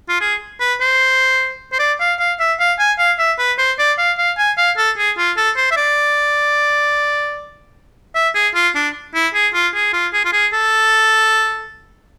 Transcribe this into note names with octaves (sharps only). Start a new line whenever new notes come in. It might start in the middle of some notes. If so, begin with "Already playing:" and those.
F4
G#4
B4
C5
C5
D5
F5
F5
E5
F5
G#5
F5
E5
B4
C5
D5
F5
F5
G#5
F5
A4
G#4
F4
A4
C5
E5
D5
E5
G#4
F4
D4
E4
G#4
F4
G#4
F4
G#4
F4
G#4
A4